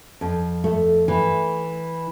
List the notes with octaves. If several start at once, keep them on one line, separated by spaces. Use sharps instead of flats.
F2
A3
E3